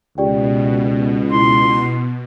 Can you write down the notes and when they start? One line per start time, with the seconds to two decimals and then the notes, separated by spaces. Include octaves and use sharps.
0.18 C#2 B2 G4 D5 G5
1.32 E4 C6